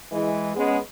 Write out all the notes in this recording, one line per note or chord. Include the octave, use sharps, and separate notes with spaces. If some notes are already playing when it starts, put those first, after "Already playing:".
E3 G#3
G#3 B3 C#4